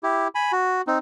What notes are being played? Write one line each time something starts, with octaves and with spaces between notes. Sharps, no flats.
E4 G4
G#5 B5
F#4
C4 D#4